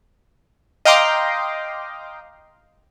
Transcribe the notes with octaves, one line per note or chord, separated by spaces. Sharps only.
D#5 F5 G5 A#5 C6 D6